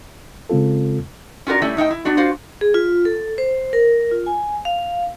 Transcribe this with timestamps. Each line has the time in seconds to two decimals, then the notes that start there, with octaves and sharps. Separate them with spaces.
0.50 C#3 G#3 C4 F4 A4
1.47 C#4 F4 F#4 A#4 D5
1.62 G3 A3 C#4 E4
1.77 A2 D#4 E5 G5
1.90 E4
2.05 B3 D4 F#4
2.17 F4 F#4 C5 F5
2.61 G#4
2.74 F4
3.05 A4
3.38 C5
3.73 A#4
4.11 F4
4.26 G#5
4.65 F5